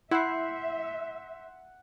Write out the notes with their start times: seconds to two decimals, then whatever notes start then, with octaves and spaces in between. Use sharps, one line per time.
0.11 E4 E5 F#5 C6 G6 C7